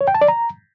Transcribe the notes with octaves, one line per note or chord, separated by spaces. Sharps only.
C#5
G5
A5
D5
A#5